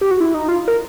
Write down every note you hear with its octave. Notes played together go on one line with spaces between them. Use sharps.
G4
F#4
E4
D#4
F4
A#4